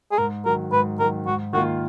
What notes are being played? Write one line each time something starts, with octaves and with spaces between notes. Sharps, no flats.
G#4
G#2 A#4
D#3 F#3 A#4
G#2 B4
D#3 F#3 A#4
G#2 F#4
D#3 A#3 F4 F#4